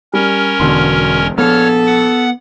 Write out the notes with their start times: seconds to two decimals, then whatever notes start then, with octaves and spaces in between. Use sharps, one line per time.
0.14 G3 C#4 A#4
0.60 E1 B2 D3 C6
1.38 A#1 B3 A4 C#5 F6
1.87 F#5